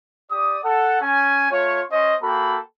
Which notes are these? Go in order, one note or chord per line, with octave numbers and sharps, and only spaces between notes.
G4 D5 D#6
A4 F#5
C#4 G#5
A3 F4 C#5
C#4 C5 D#5
A#3 F#4 A4 G5 B5